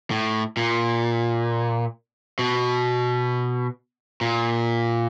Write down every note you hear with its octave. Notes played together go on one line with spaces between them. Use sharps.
A2
A#2
B2
A#2